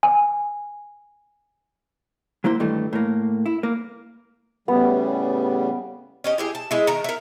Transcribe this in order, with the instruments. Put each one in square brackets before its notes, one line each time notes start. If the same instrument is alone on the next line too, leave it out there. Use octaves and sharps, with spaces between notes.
[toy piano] G#5
[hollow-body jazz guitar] F#3 A#3 E4 C5
G2 D#3 E3 A3
A2 A#3
E4
A#3
[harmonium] A2 C#3 G3 [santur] B3
[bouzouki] C#4 G4 D#5
E4 G4 G#4
A5
G#3 E4
D#3 A#4
E4 A#4